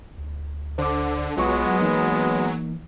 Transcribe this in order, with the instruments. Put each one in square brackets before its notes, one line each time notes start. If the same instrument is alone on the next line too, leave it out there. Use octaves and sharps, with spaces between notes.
[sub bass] D2
[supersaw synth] D3 [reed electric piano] C5 D6
[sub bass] B1 [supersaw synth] F#3 [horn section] G#3 B3 [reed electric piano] F4 C#6
[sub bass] E3 [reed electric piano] A#3 D#4